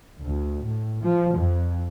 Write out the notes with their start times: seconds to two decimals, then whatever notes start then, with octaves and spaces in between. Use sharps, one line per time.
0.21 D2
0.62 A2
1.03 F3
1.36 F2